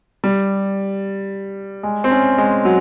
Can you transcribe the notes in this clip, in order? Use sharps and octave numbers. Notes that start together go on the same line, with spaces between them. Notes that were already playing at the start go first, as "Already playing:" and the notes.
G3
G#3
C4
C#4
G#3
F#3